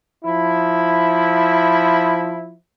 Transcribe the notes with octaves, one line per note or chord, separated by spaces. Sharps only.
F3 E4